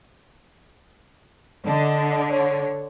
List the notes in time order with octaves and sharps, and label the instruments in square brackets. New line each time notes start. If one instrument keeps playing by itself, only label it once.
[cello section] D3 [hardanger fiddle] D#5 A5
[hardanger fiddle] C#5